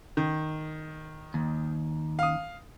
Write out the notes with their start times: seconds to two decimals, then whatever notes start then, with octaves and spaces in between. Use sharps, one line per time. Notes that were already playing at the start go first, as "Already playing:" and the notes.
0.17 D#3
1.34 D#2
2.19 F5 D#6